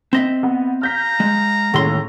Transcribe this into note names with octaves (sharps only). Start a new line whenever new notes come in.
C4 D#5 E5
B3
F5 A#5 F6 G6 B6
G#3
D#2 A2 G#3 C#4 C6